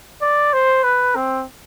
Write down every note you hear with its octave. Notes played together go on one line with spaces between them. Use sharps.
D5
C5
B4
C4